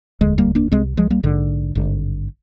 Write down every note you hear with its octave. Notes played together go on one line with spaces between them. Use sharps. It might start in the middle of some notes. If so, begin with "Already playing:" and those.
F1 D#2 D3 G#3
G3 A#3
A#3 D4
C2 C3 G#3 C4
F3 G#3
G3 A#3
A#1 G#2 D3
G#1 G2 D3